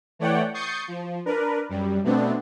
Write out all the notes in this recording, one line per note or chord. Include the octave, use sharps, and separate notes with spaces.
E3 A3 C#5 D5 F#5 G5
C#6 D#6 G6 A6 C7 C#7
F3
D4 A#4 B4
F#2 G3
B2 A3 B3 C4 D4